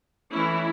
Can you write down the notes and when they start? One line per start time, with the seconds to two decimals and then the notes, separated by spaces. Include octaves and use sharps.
0.34 E3 A3 C#4 E4